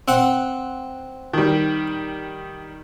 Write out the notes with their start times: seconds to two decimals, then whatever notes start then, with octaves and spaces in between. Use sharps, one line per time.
0.08 C4 F#5
1.33 D#3 G3